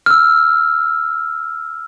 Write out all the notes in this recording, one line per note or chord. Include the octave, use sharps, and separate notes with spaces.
E6 F6